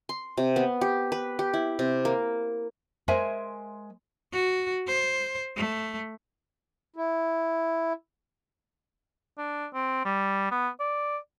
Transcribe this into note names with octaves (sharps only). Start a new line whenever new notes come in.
C6
C3
B3
G4
B4
G4
E4
C3
A#3
G#3 A#4 C5 E5 G#5
F#4
C5
A3
E4
D4
C4
G3
B3
D5